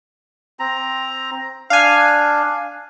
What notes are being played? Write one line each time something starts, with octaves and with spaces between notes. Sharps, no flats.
C4 A#5
D4 F5 G#5